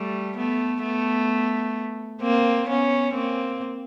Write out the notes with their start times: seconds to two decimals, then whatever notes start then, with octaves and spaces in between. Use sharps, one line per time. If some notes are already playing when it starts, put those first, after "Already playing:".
Already playing: G3 A3
0.37 A3 B3
0.83 A3 B3
2.21 A#3 C4
2.68 B3 C#4
3.14 A#3 C4